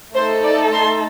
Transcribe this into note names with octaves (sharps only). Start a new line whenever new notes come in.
A3 D#4 A4 C5
D5
C6